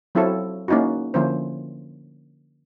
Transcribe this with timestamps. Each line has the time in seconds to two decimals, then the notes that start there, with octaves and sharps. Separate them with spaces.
0.15 F#3 C4 E4 F4 A4 C#5
0.68 A#3 C#4 D#4 E4 F#4
1.14 D3 F3 A#3 C#4 E4 C5